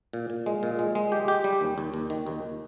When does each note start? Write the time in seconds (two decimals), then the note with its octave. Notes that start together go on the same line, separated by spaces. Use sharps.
0.13 A#2
0.30 A#2
0.46 G#3
0.63 A#2
0.79 G#3
0.95 G#3
1.12 G4
1.28 G4
1.44 G3
1.61 D#2
1.78 D#2
1.94 D#2
2.10 D#3
2.26 D#2